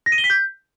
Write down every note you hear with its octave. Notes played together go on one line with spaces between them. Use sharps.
A#6
D#7
G7
B6
G6